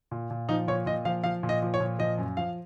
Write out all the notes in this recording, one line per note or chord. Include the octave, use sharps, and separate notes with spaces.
A#2
A#2
F3 D#4
A#2 C#5
A#2 D#5
F3 F5
F3 F5
A#2
D#5
F3
C#5
A#2
F3 D#5
F#2
F3 F5